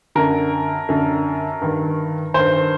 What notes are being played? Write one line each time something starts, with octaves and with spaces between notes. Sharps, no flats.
F#2 D3 A#4
F#2 D3
G2 D#3
G2 D#3 C5